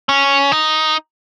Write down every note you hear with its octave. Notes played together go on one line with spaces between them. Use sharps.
C#4
D#4